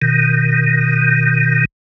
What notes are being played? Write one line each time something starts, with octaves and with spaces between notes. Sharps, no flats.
B2 D#3